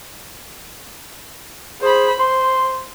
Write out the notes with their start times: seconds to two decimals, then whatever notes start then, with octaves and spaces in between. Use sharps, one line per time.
1.81 G#4 C5 B5
2.19 C5 C6